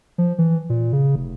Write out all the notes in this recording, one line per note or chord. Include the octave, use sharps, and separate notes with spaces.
F3
E3
A#2
C#3
F1